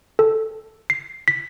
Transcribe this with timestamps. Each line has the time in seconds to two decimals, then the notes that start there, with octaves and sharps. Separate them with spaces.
0.19 A4
0.90 C7
1.28 B6